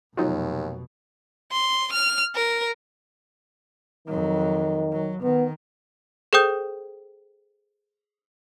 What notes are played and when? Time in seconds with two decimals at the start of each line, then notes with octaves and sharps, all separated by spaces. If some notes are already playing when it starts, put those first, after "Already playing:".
0.17 F1 D#2 B2 F#3 D#4 F4
1.52 C6
1.93 F6
2.35 A#4
4.08 F2 D#3 F#3
4.92 F#3
5.22 D#3 B3
6.33 G#4 A4 C5 G5 D#6 G6